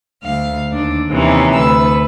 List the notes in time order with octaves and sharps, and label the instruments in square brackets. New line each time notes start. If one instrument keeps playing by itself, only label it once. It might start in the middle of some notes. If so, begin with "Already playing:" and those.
[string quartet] D2 F5
D#2 D4
D#2 C3 E3 C#4 D#4
D2 B4 E6